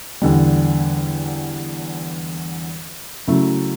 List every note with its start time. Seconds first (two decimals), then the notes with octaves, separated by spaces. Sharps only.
0.22 E2 D3 G3
3.27 C#3 F#3 A3 E4